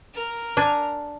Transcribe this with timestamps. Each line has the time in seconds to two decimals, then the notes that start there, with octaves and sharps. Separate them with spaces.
0.14 A#4
0.57 D4 G#5